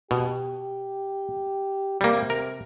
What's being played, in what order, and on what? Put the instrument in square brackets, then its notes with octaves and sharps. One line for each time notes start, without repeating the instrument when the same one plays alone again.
[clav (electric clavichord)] B2 [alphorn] G4
[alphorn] C3 [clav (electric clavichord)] G3 A#3
[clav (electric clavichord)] A#4